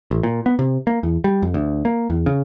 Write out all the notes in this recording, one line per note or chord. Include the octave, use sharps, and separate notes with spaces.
A1
A#2
B3
C3
A#3
E2
G3
F2
D2
A#3
E2
C#3